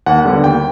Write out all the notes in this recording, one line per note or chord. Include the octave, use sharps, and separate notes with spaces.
D#2 F#5
D3 G3 B3
D#2 G5